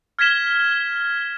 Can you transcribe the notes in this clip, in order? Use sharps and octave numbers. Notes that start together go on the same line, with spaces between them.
F6 G#6 A#6 B6 E7 G7